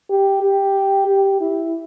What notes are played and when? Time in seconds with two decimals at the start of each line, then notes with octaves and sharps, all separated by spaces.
0.10 G4
0.43 G4
1.08 G4
1.41 E4